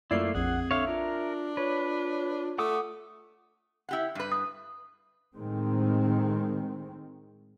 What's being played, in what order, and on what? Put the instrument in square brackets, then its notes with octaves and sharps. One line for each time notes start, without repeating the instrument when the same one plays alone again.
[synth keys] F#2 D5 C7 [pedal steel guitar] A3 A#3 E4 [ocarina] F4
[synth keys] A#1 F2 [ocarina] C4 [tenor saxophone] G#4 [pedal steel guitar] F#5
[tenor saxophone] D3 [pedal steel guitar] C#5 F5 [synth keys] E5
[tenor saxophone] D4 [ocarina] F4 [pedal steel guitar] A#4
[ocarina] F4 [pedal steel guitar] B4 [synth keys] C#5
[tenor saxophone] A3 [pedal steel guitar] F#5 D6 D#6
[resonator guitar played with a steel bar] E4 G4 F#5
G2 B4
[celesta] D#6
[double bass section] A2 D#3 G#3 C4